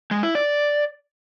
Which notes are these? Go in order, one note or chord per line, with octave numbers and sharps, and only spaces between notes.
G#3
E4
D5